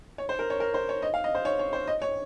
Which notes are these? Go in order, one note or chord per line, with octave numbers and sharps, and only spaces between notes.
C#5
C5
A#4
C#5
A#4
C5
C#5
D#5
F5
D#5
C5
C#5
C#5
C5
D#5
C#5